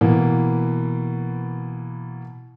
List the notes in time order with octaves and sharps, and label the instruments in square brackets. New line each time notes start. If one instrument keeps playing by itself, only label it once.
[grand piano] B2 E3 A#3